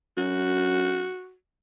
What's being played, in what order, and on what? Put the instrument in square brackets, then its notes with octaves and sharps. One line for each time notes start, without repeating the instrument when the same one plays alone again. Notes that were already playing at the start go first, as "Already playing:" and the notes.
[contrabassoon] F#2 [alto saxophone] F#4